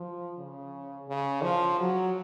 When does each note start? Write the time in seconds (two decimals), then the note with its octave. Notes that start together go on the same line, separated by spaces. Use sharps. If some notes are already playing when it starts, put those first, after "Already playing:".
Already playing: F3
0.38 C#3
1.09 C#3
1.43 F3
1.79 F#3